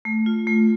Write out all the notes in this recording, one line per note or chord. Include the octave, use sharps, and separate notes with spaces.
A3
F4
A3